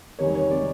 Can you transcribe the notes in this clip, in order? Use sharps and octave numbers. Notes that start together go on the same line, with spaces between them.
E2 C3 D#3 G3 C#5
C#5
C3 D#3 G3 D5